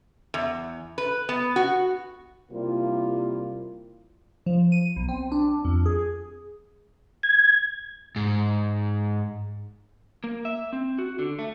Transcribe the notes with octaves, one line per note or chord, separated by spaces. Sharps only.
E2
B4
B3
F#4
C3 G3 A#3 E4 F4
F3
D#7
B1
C4
D4
F2
G#4
G#6
G#2
A#3
E5
C4
F#4
D3
A3